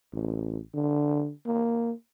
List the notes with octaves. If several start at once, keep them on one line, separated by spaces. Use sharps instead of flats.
A1
D3
A#3